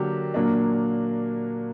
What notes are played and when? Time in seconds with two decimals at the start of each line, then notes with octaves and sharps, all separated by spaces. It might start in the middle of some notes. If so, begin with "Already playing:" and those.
Already playing: D3 F#3 A#3 D4 G4
0.34 A#2 F#3 A#3 D4